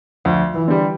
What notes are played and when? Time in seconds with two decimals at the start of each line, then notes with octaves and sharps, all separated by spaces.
0.25 D2 F3
0.54 E3
0.68 D3 G3